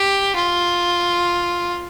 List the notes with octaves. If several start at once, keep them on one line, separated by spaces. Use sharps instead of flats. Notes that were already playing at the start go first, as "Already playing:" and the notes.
Already playing: G4
F4